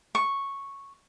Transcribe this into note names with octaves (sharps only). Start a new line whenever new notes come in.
C#6